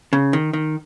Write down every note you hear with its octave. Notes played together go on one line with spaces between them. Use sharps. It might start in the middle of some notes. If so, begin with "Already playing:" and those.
C#3
D#3
D#3